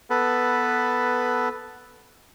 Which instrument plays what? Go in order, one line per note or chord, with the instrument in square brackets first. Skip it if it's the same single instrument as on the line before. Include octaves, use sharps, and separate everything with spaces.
[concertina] B3 A4 B4